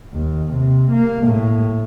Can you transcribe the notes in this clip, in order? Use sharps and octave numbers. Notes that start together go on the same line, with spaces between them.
D#2
C3
A#3
A2